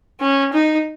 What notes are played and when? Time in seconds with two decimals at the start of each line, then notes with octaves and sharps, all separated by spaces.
0.20 C#4
0.53 D#4